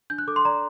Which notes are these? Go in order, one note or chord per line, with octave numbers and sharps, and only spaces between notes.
D4 G6
F#6
A4 D6
C6
D5 A#5